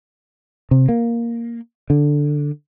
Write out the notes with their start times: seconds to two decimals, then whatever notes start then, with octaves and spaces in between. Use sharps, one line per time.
0.71 C3
0.89 A#3
1.90 D3